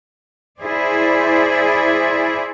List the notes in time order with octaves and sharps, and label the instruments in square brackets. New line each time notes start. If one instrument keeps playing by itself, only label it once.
[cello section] E4 G#4 C5 D5